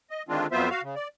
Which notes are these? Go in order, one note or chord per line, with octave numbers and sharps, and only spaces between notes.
D#5
D3 D#3 G#3 C4 D4 F4
F2 F#3 B3 F4 C5 E5
F#4 F5
C#3
D5